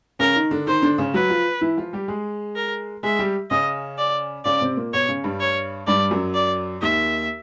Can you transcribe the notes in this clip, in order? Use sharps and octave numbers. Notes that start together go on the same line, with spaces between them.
C#3 C#4 A#4
D#3 D#4
D3 D4
D#3 D#4 C5
D3 D4
C#3 C#4
F#3 F#4 B4
F3 F4
E3 E4
F3 F4
G3 G4
G#3 G#4
A#4
G#3 G#4 E5
G3 G4
C#3 C#4 D#5
D5
C#3 C#4 D5
C3 C4
A#2 A#3
B2 B3 C#5
C#3 C#4
G2 G3
C#5
G2 G3 D5
F#2 F#3
D5
D#2 D#3 E5